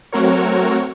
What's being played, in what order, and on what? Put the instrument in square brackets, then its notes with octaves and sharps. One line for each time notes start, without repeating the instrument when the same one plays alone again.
[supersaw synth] F#3 A3 C4 F#4 A#4 C#5